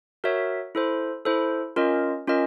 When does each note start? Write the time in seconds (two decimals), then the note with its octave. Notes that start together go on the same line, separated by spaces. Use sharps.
0.24 F#4 A#4 C#5 E5
0.75 E4 A4 C5
1.26 E4 A4 C5
1.76 C#4 F4 A#4 D#5
2.27 C#4 F4 A#4 D#5